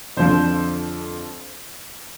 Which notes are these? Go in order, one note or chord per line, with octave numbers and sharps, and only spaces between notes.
F2 D3 F3 C5